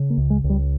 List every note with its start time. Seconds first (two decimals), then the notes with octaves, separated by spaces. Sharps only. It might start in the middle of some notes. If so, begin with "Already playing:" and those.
Already playing: C#3
0.10 A#3
0.18 C#2
0.30 G#3
0.44 C#2
0.50 G3